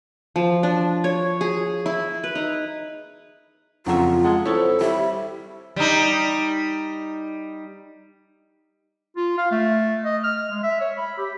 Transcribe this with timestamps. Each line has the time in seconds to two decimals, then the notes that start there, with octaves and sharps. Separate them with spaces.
0.36 F3
0.63 D4
1.04 C#5
1.41 G#4
1.86 E4
2.24 B4
2.35 D#4
3.86 F2 C#3 F#3 F4 E5 A#5
4.24 G#3 F#5 A5
4.46 C4 E4 A4 C#5
4.81 G3 E5
5.76 G3 D#4
9.17 F4
9.38 F5
9.51 A3
10.05 D#5
10.24 F6
10.51 G#3
10.64 E5
10.81 C#5
10.98 B5
11.18 G4